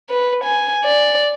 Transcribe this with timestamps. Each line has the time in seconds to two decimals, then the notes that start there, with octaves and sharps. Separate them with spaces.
0.10 B4
0.45 G#5
0.85 D5